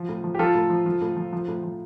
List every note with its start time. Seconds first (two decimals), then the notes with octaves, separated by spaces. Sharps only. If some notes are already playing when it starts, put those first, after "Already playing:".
Already playing: F3
0.09 A2
0.24 F3
0.35 G4
0.39 F3 F4 A4
0.55 A2
0.70 F3
0.86 F3
1.02 A2
1.17 F3
1.33 F3
1.48 A2
1.64 F3